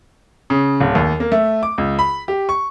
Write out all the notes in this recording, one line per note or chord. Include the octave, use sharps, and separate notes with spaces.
C#3
D1
D#2
A#3
A3
D6
C#2
B5
G4
C#6